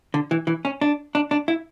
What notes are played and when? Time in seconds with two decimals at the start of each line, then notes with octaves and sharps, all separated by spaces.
0.14 D3
0.31 E3
0.47 E3
0.65 C#4
0.81 D4
1.15 D4
1.31 D4
1.48 E4